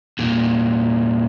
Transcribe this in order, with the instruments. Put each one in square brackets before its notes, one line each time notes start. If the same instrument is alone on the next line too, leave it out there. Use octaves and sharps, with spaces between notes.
[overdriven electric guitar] E2 A#2